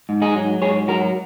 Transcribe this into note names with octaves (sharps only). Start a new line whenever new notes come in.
G#2
D#4 G#4
F#3
G#2 G#4 C#5
F#3 F#4 A#4